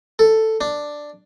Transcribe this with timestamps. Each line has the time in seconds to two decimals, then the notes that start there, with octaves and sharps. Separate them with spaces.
0.19 A4
0.61 D4